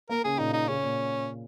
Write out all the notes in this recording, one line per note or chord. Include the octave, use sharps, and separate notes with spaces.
A#3 A#4
C#3 G#4
A#2 D#4
D#4
C#3 C#4
A#2